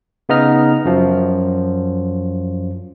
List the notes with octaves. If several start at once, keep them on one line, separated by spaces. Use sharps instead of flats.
C#3 B3 D#4 D#5 F6
F#2 F3